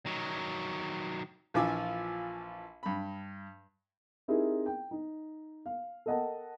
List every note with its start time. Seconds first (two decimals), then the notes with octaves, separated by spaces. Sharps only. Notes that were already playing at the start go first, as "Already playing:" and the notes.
0.06 D#3 F#3
1.54 A#1 E3 F3 G#5 D6 E6
2.83 G2 B5
4.28 C4 D#4 E4 G4 G#4 A#4
4.66 G5
4.91 D#4
5.66 F5
6.06 A4 A#4 D#5 F#5 G5 A5